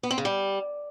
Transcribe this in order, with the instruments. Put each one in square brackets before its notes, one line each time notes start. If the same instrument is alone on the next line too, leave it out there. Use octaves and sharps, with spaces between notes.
[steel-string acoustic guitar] B3
C4
C#3
G3